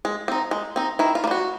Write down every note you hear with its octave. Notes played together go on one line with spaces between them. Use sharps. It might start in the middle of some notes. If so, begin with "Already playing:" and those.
G#3
C4 D#4
G#3
C4 D#4
D#3 E4
F4
A#3
G3 F#4